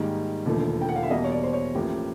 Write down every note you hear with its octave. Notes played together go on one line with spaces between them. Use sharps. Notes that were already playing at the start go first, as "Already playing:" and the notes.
Already playing: G#2 D#3 G3 A#3
E1 D#2 D3 F3 A3
G5
F#5
F5
E5
E2 B2 G3 A#3 D#5
C#5
D5
C5
C#5
A1 A2 F3 A#3 G4